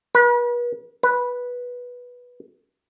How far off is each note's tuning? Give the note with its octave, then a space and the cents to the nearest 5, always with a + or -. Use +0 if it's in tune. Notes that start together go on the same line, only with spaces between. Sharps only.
B4 -40
B4 -10